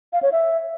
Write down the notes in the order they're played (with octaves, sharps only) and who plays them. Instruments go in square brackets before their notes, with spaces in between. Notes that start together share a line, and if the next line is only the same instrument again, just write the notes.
[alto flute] F5
C#5
E5